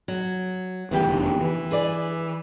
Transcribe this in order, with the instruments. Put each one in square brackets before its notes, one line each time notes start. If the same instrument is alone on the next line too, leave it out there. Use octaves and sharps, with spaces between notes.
[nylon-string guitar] F#3
[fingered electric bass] G1 E3 [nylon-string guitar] B3 G4 G5
[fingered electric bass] F1 E2 D3
E3
[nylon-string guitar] G#4 B4 D5